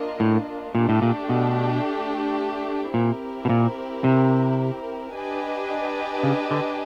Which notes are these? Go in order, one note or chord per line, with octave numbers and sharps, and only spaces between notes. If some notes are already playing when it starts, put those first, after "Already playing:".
Already playing: A#3 D4 F4 A#4 D#5
A2
A#2 A3 D4 G4
A2
A#2
B2
A#2 C4 E4 G4 A#4
B2
A#2
C3
D4 G4 B4 D#5 G#5
C#3
D3